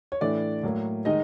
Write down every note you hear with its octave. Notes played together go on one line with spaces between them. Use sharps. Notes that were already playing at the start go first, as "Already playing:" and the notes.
C#5
A2 E3 A3 D4 D5
A2 F#3 A#3
D#3 G#3 D#4 D#5